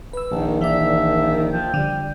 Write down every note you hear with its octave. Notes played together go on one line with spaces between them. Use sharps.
B4 E6
A#1 D#3
D#3 E3 D5 E5
F3 G5
D3 G3